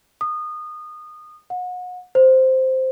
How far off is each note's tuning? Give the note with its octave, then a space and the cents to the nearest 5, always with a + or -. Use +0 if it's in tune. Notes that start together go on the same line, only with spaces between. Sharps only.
D#6 -25
F#5 -35
C5 -5